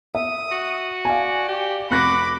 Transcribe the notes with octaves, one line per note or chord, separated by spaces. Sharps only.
E5 D#6
F#4
D5 F5 G#5
G4
F1 F#4 B5 D6 F#6 A#6